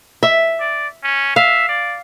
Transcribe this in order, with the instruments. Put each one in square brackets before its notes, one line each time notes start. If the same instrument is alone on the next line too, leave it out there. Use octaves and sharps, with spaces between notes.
[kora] E5
[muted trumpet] D5
C#4
[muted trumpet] E5 [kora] F5
[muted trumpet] D5